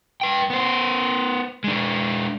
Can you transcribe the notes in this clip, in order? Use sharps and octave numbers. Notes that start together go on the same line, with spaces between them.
B4 G5
B3 C5
G#3 D4